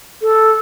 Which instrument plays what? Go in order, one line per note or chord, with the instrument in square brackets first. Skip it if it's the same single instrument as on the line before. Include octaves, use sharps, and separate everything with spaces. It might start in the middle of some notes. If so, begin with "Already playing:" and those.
[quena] A4